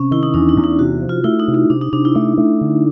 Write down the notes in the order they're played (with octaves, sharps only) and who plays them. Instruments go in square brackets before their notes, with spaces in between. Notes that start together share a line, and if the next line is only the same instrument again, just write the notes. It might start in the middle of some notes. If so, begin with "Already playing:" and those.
Already playing: [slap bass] C3 [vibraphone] C#4
[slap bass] D#3 [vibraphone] E4
[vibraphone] D#4
[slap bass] E2 [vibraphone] D4
[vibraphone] D#4
[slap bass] E2
[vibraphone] D#4
[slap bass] C3 [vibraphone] F#4
[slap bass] F3
[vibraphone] F4
[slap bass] A3 [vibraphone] E4
[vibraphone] D#4
[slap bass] C3
[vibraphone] D#4
[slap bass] C3 [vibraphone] D4
[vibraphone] D#4
[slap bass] C3 [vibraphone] D4
[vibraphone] E4
[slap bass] A3 [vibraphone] D#4
[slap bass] A3
D3